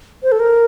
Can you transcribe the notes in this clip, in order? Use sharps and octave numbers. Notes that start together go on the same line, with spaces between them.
C5
A4
A#4